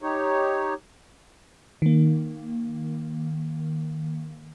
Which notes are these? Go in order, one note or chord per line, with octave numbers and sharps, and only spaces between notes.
D#4 G4 C#5
D#3 A#3